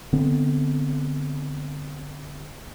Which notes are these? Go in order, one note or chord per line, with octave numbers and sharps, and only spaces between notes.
D3 B3 C4